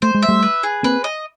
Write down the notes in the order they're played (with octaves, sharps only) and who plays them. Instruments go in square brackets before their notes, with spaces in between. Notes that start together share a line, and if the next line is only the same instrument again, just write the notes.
[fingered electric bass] A3 [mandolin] C5
[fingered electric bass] G#3
[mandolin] E5
[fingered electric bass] G3 A3
[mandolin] B4
G#4
[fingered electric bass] A#3 C4 [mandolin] B4
[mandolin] D#5